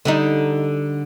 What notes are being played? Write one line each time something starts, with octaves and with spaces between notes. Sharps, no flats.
D3 G3 D#4